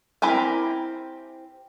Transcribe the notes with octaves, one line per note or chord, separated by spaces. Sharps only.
C4 E4 G4 A#4 G#5